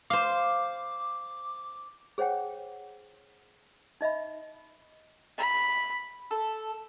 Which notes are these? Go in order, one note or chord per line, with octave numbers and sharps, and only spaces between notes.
C5 F5 D6
G#4 C5 C#5 F#5 G5
D#4 D#5 E5 B5
B5
A4